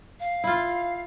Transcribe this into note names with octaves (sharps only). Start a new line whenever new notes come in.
F5
E4 F4